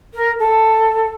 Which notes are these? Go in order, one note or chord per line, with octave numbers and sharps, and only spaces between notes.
A#4
A4